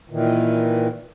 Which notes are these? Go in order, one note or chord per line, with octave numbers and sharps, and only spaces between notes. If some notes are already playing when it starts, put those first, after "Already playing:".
A#2 D#3 E3